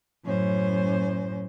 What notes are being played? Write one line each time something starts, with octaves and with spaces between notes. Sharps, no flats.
F#2 A2 C#4 C5